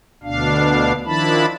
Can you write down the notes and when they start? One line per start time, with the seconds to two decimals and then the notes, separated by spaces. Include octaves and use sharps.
0.24 D2 B2 D4 F5
1.06 D#3 F3 D4 E4 A5 B5